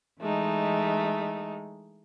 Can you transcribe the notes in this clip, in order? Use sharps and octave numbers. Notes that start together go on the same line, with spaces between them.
E3 G#3 A3 D#4